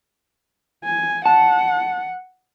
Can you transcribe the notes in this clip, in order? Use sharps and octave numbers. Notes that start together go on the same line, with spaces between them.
G#5
F#5 A5